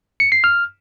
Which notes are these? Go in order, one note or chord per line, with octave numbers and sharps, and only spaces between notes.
C#7
C7
F6